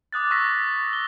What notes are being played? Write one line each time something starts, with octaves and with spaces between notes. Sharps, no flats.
D6 D#6 F#6 A6
C#6 E6 A#6 B6
A6
G7